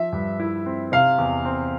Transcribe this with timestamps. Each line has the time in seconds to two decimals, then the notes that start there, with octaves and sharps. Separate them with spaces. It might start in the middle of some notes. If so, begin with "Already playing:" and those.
Already playing: F3 E5
0.13 G2
0.40 E4
0.66 C4
0.92 C3 F5
1.18 E2
1.45 C4